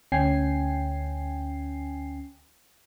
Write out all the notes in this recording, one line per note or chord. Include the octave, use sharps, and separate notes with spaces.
D2 C#4 G5 G#5 C7